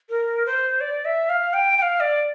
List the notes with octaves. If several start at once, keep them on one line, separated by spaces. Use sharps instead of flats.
A#4
C5
D5
E5
F5
G5
G5
F5
D5